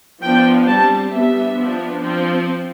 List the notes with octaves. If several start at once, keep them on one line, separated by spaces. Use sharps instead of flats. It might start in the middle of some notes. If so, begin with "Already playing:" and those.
F3 B3 D4 G5
G3 C4 A5
G3 B3 D4 E5
F3 B3 D4
F3 C4